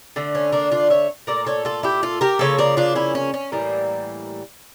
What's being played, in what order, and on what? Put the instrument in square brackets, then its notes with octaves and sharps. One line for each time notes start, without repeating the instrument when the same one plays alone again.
[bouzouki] D3 A3
C#4
A#3 D4
D4 F4
C#5 E5
A#2 A3 A#4 D5
A4 C#5
F4 A4
E4 G4
F4 A4
G4 A#4
C#3 F3 A#3 A4 C#5
A#4 D5
D4 F4
C#4 E4
C#4
C#4
A2 E3 G3 A#3